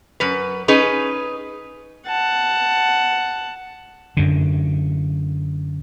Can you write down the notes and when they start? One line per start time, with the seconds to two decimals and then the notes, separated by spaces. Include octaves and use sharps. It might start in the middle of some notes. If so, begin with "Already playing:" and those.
0.20 F#2 B4
0.68 C#4 D#4 G#4 B4
2.07 F#5 A5
4.17 F#2 D3